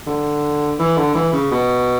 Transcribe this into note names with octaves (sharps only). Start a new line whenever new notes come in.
D3
E3
D3
E3
C#3
B2